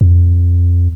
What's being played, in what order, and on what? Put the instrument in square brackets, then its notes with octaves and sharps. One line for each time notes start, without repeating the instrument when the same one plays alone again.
[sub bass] F2